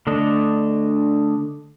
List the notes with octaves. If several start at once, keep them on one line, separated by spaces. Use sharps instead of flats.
D3 A3 D4 D#5